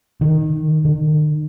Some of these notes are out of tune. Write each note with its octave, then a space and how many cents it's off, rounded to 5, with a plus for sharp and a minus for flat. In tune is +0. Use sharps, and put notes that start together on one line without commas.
D#3 -5
D#3 -40